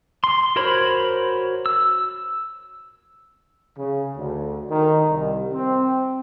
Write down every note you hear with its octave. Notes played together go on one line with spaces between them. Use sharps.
C6
F#4 A#4 C5 C#5 B5
E6
C#3
D2
D#3
C2
C4